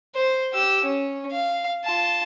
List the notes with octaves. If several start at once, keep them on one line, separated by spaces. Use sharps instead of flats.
C5
G4 E6
C#4
F5
F4 A5